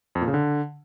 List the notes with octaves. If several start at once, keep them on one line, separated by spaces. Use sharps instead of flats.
F2
A#2
C#3
D3